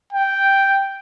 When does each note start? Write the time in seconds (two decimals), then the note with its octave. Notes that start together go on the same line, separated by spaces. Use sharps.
0.12 G5